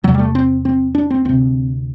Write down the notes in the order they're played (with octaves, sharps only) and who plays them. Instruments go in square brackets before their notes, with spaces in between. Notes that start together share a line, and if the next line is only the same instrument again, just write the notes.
[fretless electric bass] E2 C3 F#3
G3
A3
C4
C4
D4
C4
D2 C3 C4